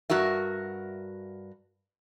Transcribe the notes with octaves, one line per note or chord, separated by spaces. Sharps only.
G2 F#4 A#4 E5